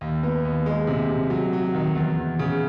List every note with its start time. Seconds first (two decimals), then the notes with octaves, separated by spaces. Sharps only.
0.01 D#2
0.23 B3
0.45 D#2
0.66 G#3
0.87 C3
1.09 C3
1.30 F#3
1.53 F#3
1.75 D#3
1.95 E2
2.17 E2
2.39 C#3